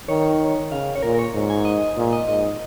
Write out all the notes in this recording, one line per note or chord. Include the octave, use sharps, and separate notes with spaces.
D#3 C#5
C#3 F5
C#5
A#2 A#4
A#4
C#5
G#2
G#5
D#5
A#2
D#5
G#2 D#5